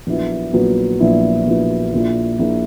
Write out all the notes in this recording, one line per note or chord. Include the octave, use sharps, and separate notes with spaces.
A#1 A#2 F#3 B3 E4
A#1 A#2 F#3 B3 E4
A#1 A#2 F#3 B3 E4
A#1 A#2 F#3 B3 E4
A#1 A#2 A#3 E4
A#1 A#2 A#3 E4